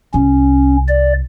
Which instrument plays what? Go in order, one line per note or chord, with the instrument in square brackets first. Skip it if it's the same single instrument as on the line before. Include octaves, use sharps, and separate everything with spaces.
[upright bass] C2 [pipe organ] C#4
[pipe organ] D5